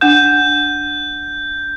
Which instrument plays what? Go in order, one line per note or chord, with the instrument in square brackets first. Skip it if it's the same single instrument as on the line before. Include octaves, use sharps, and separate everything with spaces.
[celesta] D4 F#5 E7 [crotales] G6